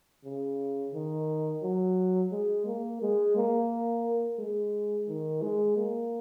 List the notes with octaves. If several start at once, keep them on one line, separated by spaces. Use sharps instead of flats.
C#3
D#3
F#3
G#3
A#3
G#3
A#3
G#3
D#3
G#3
A#3